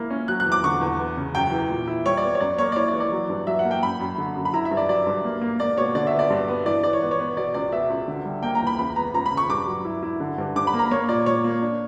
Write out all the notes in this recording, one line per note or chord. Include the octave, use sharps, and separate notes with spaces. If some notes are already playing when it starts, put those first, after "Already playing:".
Already playing: A#3 E4
C#4
F#3 F#6
F#6
E2
D6
D3 C#6
E2
B3
C#3
F#2 G5
E3
A#2
E4
G3 C#5
D5
B3
C#5
F#2 D5
A#3 C#5
D5
E4 C#5
D5
E3
D5
F#3
G2
F#3 E5
F#5
A#3
G5
F#2 B5
F#2
D3
F#2
B5
E4 A#5
E5
G2
D5
F#3 D5
G2
A#3
A#3
A#3 D5
B2 C#5
D3 D5
E5
B3
D5
G2
B3
E3 D5
E3 D5
C#5
B3
C#5
B3
B2 D5
C#2 D5
B2 E5
C#2
D3
G3
A#3 G5
A#5
E2
B5
C#2 B5
B3 A#5
C#2 A#5
B5
C#3
C#6
G2 D6
F#3
E4
E4
D3
G2
G2 D6
B5
A#3
A#5
A#3 C#5
A#2 D5
A#2 C#5
A#3
D4